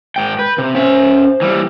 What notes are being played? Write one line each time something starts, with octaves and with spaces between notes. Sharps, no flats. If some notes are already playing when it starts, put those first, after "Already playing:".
G#2 G5
B4 G6
C3
C#4 C5 E5
E3 G3